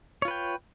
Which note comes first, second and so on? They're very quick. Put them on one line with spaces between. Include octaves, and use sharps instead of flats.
C#5 F4 B4 G5